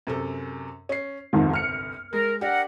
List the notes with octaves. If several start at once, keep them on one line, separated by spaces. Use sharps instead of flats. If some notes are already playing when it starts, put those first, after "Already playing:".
F#2 C3 A4
C#4 C7
G1 C2 F2 G#2 D#3
F6 C#7
G#3 A#4
D4 G4 A#4 F#5